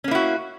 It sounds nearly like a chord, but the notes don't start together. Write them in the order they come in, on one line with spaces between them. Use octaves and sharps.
C#4 A#3 E4 F#4